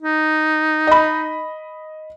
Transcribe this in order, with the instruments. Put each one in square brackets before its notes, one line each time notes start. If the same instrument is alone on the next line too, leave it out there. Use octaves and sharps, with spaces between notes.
[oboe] D#4
[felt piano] D#5 B5